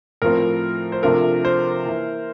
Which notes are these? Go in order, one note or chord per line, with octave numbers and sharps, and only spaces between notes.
A2 F3 C4 A#4
C5
C3 F3 A3 D4 F4 A#4
C5
E3 A#3 E4